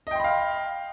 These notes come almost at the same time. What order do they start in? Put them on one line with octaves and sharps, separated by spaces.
D#5 G5 C6 B5 F5